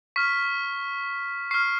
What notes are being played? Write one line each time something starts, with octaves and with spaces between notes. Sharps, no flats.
C#6 F6 B6
C#6 F6 C7